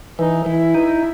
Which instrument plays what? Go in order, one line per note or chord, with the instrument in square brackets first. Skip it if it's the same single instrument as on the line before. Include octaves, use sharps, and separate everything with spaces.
[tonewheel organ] E3 [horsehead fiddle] D#4
[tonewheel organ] E3 [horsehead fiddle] E4
[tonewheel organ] D#4